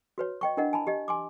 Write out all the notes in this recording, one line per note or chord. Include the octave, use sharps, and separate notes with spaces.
F#4 B4 C#5
D#5 G5 C#6
D4 E4 A#4 D#5 F#5
G#5 A5 B5
G4 D#5
G#5 C6 D6